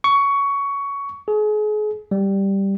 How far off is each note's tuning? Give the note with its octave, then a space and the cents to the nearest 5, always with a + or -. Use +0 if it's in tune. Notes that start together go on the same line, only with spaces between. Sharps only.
C#6 +15
G#4 +35
G3 +0